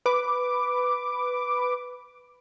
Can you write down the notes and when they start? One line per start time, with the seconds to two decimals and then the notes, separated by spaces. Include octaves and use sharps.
0.06 B4 D6